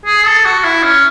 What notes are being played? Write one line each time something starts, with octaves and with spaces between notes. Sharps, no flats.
G#4
A4
F#4
E4
C#4